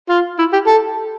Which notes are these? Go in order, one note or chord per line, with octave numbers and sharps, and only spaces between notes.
F4
E4
G4
A4